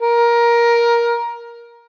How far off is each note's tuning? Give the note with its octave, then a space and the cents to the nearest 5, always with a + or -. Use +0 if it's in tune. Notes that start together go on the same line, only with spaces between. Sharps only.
A#4 +15